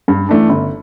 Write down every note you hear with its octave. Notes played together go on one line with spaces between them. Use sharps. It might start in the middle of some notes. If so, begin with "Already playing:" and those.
G2
E3 A3 D4
G1